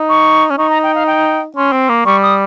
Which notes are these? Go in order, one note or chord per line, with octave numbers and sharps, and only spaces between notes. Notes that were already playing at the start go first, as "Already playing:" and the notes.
Already playing: D#4
C#6
C#4
D#4 C#6
A#5
G5
F5
G5
C#4 C6
C4
A#3
G3 C#6
D#6